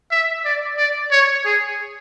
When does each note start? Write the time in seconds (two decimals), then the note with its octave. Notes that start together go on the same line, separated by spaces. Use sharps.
0.11 E5
0.45 D5
0.77 D5
1.11 C#5
1.45 G#4